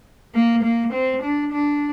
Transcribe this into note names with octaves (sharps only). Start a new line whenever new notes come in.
A#3
A#3
C4
D4
D4